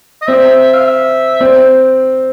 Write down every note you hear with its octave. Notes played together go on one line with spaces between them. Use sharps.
D#5
C4 E5
F5
E5
C4